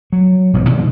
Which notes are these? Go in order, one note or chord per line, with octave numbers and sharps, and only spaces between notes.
F#3
E1 B1 F2 G#2
B2 D#3 F3 G#3